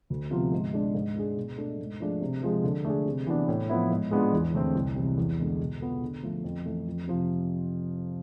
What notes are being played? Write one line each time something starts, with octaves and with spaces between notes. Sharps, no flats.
D2
C3 F3 B3 F4
G#2
G#3 D4 G#4
G#2
G#3 D4 G#4
B2
A3 D4 A4
G#2
F3 A3 D4 G#4
C3
F3 G#3
D3
A3 D4 G#4
C3
E3 B3 D4
A2
F3 B3 E4
G#2
G#3 B3 D4 F4
E2
D3 A3 C4
C2
C3 E3
E2
D3 G#3 B3
B2
B3 F4 A4
D3
F3 A3
F2
E3 A3
F2
C3 F3